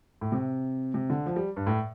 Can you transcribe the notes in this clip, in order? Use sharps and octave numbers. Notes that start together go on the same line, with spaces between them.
A2
C3
C3
D3
F3
G3
G2
A2